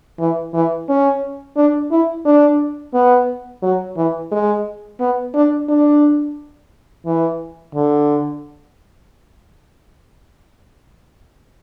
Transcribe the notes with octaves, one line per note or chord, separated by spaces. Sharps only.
E3
E3
C#4
D4
E4
D4
B3
F#3
E3
G#3
B3
D4
D4
E3
D3